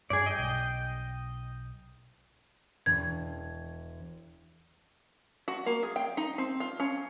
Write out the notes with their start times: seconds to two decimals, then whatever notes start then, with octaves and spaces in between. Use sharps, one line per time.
0.10 G2 G#4 D5
0.26 D#5 G5
0.38 B1
2.86 E1 G#6
5.48 F#4
5.66 A#3
5.83 G#4
5.96 G5
6.17 D#4
6.38 C4
6.60 F4
6.80 C#4